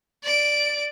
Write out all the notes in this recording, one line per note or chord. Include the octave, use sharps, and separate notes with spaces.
D5 D7